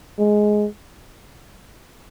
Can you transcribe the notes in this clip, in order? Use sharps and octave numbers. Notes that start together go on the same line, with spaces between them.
G#3